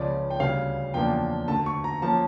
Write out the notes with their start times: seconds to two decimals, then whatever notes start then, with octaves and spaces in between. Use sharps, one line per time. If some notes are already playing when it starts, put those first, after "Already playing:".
Already playing: C#2 C#3 F3 C#4 D5
0.30 G5
0.40 D2 C#3 G3 F5
0.94 E2 C#3 F3 A#3 D4 G5
1.48 D2 D3 A3 A5
1.66 C#6
1.84 A#5
2.02 F3 A#3 C#4 A5